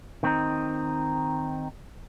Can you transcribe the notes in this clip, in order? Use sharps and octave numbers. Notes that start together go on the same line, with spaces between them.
D#3 C4 D#4